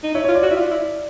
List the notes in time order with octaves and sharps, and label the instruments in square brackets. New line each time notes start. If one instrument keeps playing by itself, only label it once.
[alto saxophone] D#4
[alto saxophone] E4 [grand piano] C#5
[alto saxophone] F4 [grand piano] C#5
[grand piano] D5
[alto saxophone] F#4
[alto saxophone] E4 [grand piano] D5
[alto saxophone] F4
E4